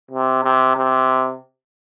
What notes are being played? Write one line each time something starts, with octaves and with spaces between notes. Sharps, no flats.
C3
C3
C3